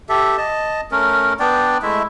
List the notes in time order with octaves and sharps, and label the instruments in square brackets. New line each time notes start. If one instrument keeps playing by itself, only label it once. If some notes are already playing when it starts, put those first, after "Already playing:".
[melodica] G4 A4 E5
D#5 A5
A3 C#4 A#4
B3 D4 D5 G5
G#3 A3 E4 E5